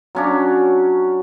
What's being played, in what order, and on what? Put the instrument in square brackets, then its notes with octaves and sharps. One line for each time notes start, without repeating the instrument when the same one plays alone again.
[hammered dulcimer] F#3 C#4 D4